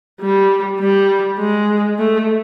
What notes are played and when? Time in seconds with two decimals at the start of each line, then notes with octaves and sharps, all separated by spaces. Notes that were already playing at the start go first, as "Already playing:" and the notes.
0.21 G3
0.80 G3
1.39 G#3
1.98 A3